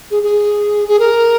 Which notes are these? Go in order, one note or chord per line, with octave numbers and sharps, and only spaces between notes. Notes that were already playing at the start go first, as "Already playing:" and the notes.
G#4
G#4
G#4
A#4